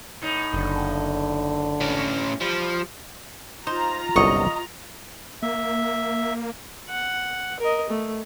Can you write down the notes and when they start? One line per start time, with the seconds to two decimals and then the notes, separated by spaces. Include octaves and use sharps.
0.22 A2 D#4
0.54 F#1 D3
1.80 A2 C#4
2.41 F3 G3
3.67 D#4 F4 C5 A#5
4.16 G1 C2 F#2 D#5 C#6
5.42 A#3 E5
6.90 F#5
7.60 A#4 D#5
7.89 A3